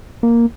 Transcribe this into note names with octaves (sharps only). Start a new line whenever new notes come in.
A#3